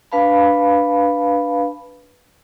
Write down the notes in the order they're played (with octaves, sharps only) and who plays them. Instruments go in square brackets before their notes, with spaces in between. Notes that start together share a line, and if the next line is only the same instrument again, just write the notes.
[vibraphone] D4 B4 F5 A5 B5